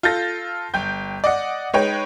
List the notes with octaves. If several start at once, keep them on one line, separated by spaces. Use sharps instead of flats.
F4 A4 G6 A6 A#6
G1 G5 G6
D5 D#5 F#5
G#3 D#4 B4 C#5 G5